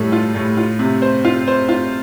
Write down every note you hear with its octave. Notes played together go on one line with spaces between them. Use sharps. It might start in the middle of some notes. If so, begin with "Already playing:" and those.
Already playing: A2 G3 A4
F4
A2
F4
C3
C5
F4
C5
F4